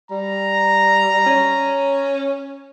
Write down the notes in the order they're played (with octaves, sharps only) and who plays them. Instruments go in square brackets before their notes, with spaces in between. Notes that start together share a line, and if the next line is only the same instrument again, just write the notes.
[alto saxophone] G3 [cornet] A#5
[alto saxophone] C#4